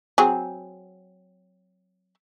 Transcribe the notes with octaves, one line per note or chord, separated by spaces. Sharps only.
F#3 C4 G#4